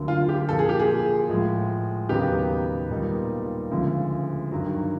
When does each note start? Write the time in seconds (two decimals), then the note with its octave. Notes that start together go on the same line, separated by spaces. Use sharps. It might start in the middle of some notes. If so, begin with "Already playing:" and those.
Already playing: D2 D3 F#3 A#3
0.08 F4
0.29 G4
0.49 A#2 F3 A#3 A4
0.59 G#4
0.69 G4
0.79 G#4
1.29 A2 F3 G#3
2.09 D#2 C#3 F#3 B3 D#4 G4
2.90 A#2 G3 B3 D#4
3.71 D2 C#3 F3 G#3
4.51 G2 D#3 F#3